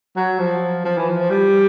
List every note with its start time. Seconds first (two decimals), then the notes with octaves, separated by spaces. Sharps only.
0.16 F#3
0.39 F3
0.85 F3
0.98 E3
1.09 F3
1.30 G3